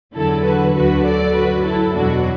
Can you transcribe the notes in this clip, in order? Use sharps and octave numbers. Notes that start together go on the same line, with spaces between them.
E2 D3 F#3 E4 A4
F#4 B4
D2 D3 F#3 F#4 B4
A4 D5
F#2 F#3 F#4 B4
E4 A4
E2 B2 F#3 D4 F#4